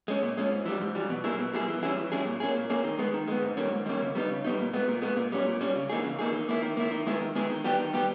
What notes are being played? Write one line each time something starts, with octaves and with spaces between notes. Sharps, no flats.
G#3 C#4
A#2
G#3 C#4
G#2
E3 G3
G#2
E3 G3
B2
G3 A#3 E4 G#4
B2
G3 A#3 E4 G#4
E3
G3 C#4 E4 G#4
E3
G3 C#4 E4 G#4
A#2
A#3 C#4 G#4
A#2
A#3 C#4 G#4
D#3
G#3 B3
D#3
G#3 B3
G#2
D#3 G3 A#3 C#4
G#2
D#3 G3 A#3 C#4
C#3
G3 B3 D#4
C#3
G3 B3 D#4
A#2
G#3 B3
A#2
G#3 B3
A#2
G3 C#4
A#2
G3 C#4
C#3
E3 A#3 D#4 G#4
C#3
E3 A#3 D#4 G#4
D#3
A#3 E4
D#3
A#3 E4
D#3
G#3 B3 E4 G#4
D#3
G#3 B3 E4 G#4
D#3
G3 B3 G4
D#3
G3 B3 G4